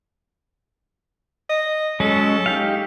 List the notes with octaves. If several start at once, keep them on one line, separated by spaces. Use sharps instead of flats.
D#5
F#3 G#3 C#4 A4
D#4 G4 F5